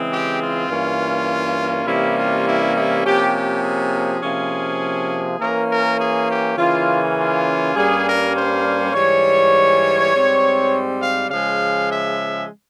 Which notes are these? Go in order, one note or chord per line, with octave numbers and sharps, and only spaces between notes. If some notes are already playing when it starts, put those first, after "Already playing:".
Already playing: C#3 E3 G#3 C4
G4
F4
G2 E3 A#3 C#4
C3 E3 G3 A#3 C#4 E4
F4
E4
E4
C3 F3 A#3 C#4 G4
G4
G#4
C3 F3 A#3 C#4
E3 A#3 C#4 A#4
A#4
G#4
G4
C#3 E3 A#3 C#4 F4
F4
G2 G3 A#3 C#4 G#4
A#4
C5
G#2 E3 G3 C#5
G#2 G3 C4
F5
C#3 F3 G#3 F5
E5